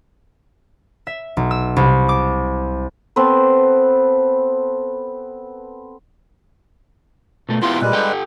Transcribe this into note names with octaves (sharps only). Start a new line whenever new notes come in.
E5
B1
E6
C2
D6
B3 C4 A4 B4
B2 A3
B3 E4 F4 G4 C6
A#2 G3 G#3 B4
G4 A4 G5